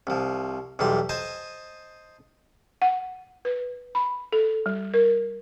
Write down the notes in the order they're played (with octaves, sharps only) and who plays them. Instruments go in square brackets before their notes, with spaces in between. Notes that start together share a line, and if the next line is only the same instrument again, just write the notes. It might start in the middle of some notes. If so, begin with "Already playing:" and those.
[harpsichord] C2 F3
B1 E2 G3 C6
C5 D#5 G#5 A5
[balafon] F#5
B4
B5
A4
G3
A#4